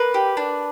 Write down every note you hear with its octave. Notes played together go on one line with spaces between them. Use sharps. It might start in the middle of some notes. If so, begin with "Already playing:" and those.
Already playing: A#3 B4
G4
D4